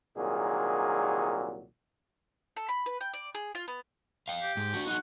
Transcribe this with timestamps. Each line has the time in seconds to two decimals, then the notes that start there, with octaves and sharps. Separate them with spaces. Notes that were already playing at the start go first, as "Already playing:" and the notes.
0.16 C2 A#2 D#3 F#3 G#4
2.57 A4
2.69 B5
2.86 B4
3.01 G5
3.13 D5
3.35 G#4
3.55 F4
3.68 B3
4.28 F5 G5
4.43 G4
4.57 G#2
4.74 D4 F#4
4.87 D#4 F#4 F#5